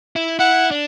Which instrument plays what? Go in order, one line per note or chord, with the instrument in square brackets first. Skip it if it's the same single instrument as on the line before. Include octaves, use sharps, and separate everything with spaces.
[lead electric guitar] E4
[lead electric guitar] E4 [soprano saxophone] F#5
[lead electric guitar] D4